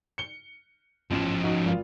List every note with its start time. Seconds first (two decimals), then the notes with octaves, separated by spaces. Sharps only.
0.18 C#7 G7
1.11 A1 F3 C#4 E7
1.43 D#4 F#4
1.65 G#1 F4